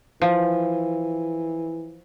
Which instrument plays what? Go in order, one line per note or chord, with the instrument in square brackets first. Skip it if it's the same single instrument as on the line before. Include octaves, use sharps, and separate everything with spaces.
[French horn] E3 [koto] F3